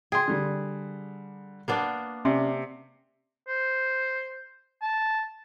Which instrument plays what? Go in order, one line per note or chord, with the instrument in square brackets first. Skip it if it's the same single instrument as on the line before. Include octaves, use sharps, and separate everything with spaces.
[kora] G#4 [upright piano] G5 C6
[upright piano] D3 G3
[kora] A#3 B3 D4
[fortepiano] C3 [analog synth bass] C#4 [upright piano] D5
[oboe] C5
A5